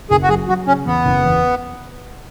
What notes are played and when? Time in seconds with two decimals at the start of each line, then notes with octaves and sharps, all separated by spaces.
0.10 F#1 G#4
0.22 F#4
0.29 F#3 G#4
0.48 F#3 F#4
0.67 C#3 C#4
0.86 E2 B3
1.05 F#1
1.25 E2